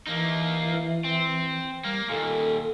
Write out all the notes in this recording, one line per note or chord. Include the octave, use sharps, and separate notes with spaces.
E3 A#3 D#4
C4
G3 A#3
D#2 A#2 A4